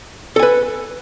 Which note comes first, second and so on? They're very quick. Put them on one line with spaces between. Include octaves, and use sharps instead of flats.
A4 G#5 B4